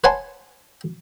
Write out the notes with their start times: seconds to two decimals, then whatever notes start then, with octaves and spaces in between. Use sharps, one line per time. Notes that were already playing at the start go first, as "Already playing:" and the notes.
0.04 B4 C#5 F#5 G#5 A5 C6